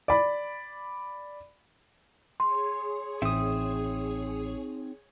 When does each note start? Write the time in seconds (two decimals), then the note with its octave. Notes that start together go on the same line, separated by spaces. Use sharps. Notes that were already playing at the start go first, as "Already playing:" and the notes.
0.08 D5 B5
2.40 G#4 C#5 C6
3.22 A1 C4 D#4 E5 D#6